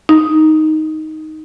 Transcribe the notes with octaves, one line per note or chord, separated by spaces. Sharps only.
D#4